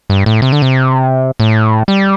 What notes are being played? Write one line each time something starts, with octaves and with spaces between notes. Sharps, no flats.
G2
A2
C3
D3
C3
A2
G3